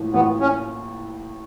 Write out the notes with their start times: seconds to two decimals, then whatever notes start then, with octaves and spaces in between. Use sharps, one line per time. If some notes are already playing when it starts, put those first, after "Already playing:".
Already playing: A1 A2 F3 A#3
0.13 A1 A2 F3 A#3 B3
0.40 C#4